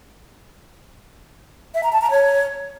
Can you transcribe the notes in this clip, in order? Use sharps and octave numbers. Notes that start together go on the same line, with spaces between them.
E5
A#5
A5
A#5
C#5